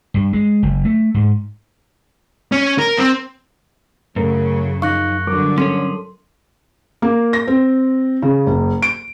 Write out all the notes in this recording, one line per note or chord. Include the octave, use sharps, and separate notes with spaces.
G2
G#3
F#1
A3
G#2
C#4
A#4
C4
F#2 C#3 F#3 A3 A4 A#4
F3 D#4 F5 C#6 F#6 A#6
G2 D3 F#3 A#4 D6
C#4 A4 C#5 C6
A#3
A#6
C4
C#3
F#1
D7